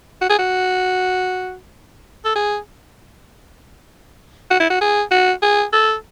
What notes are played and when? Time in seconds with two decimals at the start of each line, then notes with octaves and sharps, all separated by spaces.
0.21 F#4
0.30 G#4
0.39 F#4
2.25 A4
2.36 G#4
4.51 F#4
4.60 E4
4.70 F#4
4.81 G#4
5.11 F#4
5.42 G#4
5.73 A4